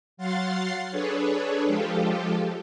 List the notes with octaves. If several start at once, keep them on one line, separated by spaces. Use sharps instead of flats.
F#3 F5 F#5 C6 A6 C7
D4 G#4 A4 B4 C#5
F3 G#3 F4 G4 A4